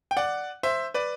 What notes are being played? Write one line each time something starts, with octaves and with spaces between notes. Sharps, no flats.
G5
D5 F#5
C5 E5
B4 D5